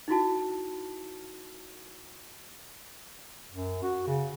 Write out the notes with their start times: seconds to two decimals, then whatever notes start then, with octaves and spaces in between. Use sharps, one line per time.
0.08 D#4 E4 F#4 A5
3.51 F#2
3.82 F#4
4.07 C#3